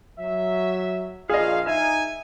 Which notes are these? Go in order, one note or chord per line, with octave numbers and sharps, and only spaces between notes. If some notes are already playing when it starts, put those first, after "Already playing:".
F#3 E5
A#1 F4 G#4 D#5 F5
D#4 E5 G#5